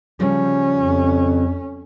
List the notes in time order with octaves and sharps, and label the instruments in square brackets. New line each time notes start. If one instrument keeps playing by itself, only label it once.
[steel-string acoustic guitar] C#3 F3 G3 [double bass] C#4
[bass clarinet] F2